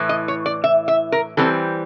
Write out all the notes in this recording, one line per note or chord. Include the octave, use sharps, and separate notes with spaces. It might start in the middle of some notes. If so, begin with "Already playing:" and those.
Already playing: A2 E3
D#5
C#5
D5
E5
E5
A#4
E3 G3 C4 A4